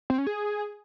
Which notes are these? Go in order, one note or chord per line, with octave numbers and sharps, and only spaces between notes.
C4
C#4
G#4